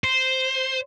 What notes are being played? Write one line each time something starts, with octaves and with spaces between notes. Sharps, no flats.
C5